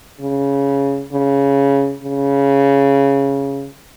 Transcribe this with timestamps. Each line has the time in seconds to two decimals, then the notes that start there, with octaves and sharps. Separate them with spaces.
0.20 C#3
1.12 C#3
2.03 C#3